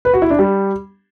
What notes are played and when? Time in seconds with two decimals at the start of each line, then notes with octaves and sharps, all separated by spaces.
0.05 B4
0.13 F#4
0.22 E4
0.30 D4
0.39 G3